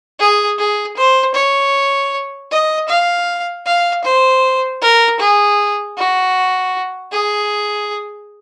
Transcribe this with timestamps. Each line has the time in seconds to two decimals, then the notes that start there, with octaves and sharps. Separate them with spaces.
0.19 G#4
0.58 G#4
0.97 C5
1.35 C#5
2.51 D#5
2.89 F5
3.66 F5
4.04 C5
4.82 A#4
5.19 G#4
5.98 F#4
7.12 G#4